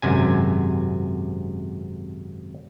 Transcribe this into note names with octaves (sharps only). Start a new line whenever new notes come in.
G#1 F#2 C3 G#5